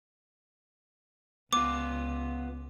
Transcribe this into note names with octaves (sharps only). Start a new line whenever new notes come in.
C#2 B3 F4 D6